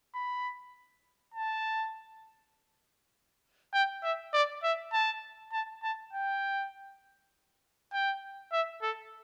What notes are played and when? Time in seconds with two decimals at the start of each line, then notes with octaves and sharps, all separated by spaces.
0.15 B5
1.34 A5
3.74 G5
4.03 E5
4.34 D5
4.63 E5
4.93 A5
5.53 A5
5.83 A5
6.13 G5
7.93 G5
8.52 E5
8.82 A4